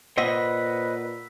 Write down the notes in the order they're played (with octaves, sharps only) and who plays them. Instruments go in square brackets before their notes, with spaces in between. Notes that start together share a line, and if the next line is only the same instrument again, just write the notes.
[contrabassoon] A#2 [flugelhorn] B4 [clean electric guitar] C5 D#5 F#5 [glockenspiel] E6 B6